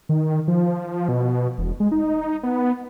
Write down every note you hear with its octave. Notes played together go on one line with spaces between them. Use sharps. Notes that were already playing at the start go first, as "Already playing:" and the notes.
D#3
F3
B2
E1
G#3
D#4
B3